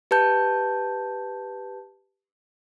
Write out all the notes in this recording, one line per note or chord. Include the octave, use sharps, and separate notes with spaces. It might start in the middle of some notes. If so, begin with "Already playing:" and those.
G4 B4 A5 G6